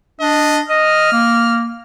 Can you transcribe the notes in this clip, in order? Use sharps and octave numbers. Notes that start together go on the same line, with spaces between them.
D4 D#5
D#5 F6
A#3